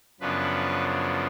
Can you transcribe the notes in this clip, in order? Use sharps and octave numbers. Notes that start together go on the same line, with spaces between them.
F#2 C#3 F3 B3 D4 B4